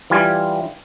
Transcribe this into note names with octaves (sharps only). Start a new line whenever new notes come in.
E3 G3 F4 G#5